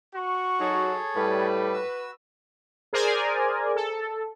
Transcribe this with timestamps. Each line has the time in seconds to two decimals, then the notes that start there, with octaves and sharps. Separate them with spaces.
0.14 F#4 C#6
0.60 F#3 D#4 G#4 A4 C#5
1.16 A2 G3 B4
1.73 F#4 E6
2.93 G#4 A#4 C5 D5 G#5
3.76 A4